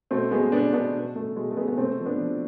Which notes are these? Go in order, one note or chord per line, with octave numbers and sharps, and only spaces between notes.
B2 A3 C4
B2 G#3 B3
B2 B3 D4
B2 B3 D4
B2
B2 A3
B2 G#3
A3
B2 G#3 B3
B3
C3 A3 C4
F3
B3 D4
F3